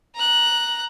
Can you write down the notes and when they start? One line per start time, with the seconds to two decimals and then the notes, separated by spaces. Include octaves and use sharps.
0.15 A#5 F#6